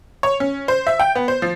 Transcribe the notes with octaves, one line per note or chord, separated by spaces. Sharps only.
C#5
C#4
C5
E5
G5
B3
C5
F3